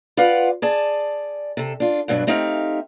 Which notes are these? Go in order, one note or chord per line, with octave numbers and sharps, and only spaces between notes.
F4 B4 D5 F5 F#5
G#4 D5 A5
C3 A4
D4 F4
G2 B2 F#3 D4
A3 C4 D#4 G4 E5 F5